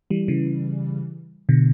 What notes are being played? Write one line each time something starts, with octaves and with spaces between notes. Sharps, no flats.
E3 G3
C#3 E3
B2 D3